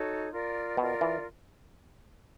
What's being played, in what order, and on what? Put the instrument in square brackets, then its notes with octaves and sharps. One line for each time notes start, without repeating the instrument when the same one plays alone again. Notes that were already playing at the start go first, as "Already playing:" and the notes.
Already playing: [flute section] D#4 F#4 A4 C#5
F4 A#4 D5
[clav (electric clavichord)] B2 [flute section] F4 A#4 D5
[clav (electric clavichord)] E3